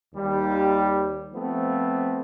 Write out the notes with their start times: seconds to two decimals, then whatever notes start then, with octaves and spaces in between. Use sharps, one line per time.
0.14 D#2 G3
1.33 F3 A3 B3 C4